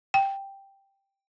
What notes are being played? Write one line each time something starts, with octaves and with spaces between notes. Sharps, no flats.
G5